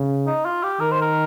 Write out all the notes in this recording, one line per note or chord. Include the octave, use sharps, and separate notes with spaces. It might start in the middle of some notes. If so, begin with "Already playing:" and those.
Already playing: C#3
D#4
F4
G4
D#3 A#4
C5
A#4